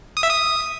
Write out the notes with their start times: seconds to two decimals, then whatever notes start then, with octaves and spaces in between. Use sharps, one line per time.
0.17 D#6
0.23 E5
0.29 D#6